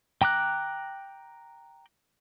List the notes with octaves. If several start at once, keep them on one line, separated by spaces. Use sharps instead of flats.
G5 A#5 D6 F#6